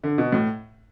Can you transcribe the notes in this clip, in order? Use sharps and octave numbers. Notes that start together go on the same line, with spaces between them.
D3
B2
A2